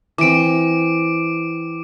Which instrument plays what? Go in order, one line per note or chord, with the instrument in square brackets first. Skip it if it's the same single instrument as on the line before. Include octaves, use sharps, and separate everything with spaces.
[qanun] E3 C4 [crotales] D6 D7